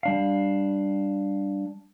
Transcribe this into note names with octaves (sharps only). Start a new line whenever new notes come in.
G3 D4 F5